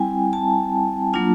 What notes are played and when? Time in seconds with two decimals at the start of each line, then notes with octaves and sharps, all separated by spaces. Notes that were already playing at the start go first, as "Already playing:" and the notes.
Already playing: G3 C4 E4 G5 G#5
0.33 A5
1.14 F#3 A#3 D4 F4